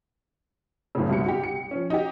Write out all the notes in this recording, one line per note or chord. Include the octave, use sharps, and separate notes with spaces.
F#1 A2 C#3
C2 G2 B2 C#7
F#4 G4
C#7
F3 C#4
D#4 F#4 G4